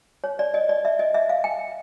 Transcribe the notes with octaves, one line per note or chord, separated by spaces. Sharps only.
C#5
D5
D#5
D5
E5
D#5
E5
F5
G5